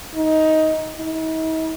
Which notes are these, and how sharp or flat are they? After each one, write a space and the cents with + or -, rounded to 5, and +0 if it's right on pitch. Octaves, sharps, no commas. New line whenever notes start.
D#4 +15
D#4 +45